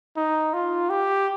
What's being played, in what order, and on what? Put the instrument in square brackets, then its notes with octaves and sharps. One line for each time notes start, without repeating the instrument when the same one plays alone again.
[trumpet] D#4
F4
G4